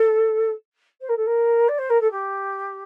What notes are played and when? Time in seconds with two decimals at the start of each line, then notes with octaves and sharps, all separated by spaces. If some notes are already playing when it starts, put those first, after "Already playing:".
Already playing: A4
1.01 C5
1.09 A#4
1.16 A4
1.26 A#4
1.68 D5
1.78 C5
1.89 A#4
2.00 A4
2.10 G4